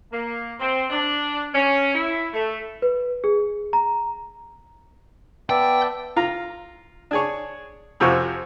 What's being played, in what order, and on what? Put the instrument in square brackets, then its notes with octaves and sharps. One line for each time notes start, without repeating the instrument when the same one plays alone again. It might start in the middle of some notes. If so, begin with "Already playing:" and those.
[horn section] A#3
C4
D4
C#4
E4
A3
[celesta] B4
G#4
A#5
[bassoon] B3 [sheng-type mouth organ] D5 E5 A5 [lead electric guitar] G5
[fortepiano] F4 A#5
D4 G#4 C#5
F2 C3 F3 F#4 G#5 C#6